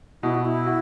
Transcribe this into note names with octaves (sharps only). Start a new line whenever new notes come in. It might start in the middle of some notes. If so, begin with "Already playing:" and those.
B2 E4
F#4
E4
F#4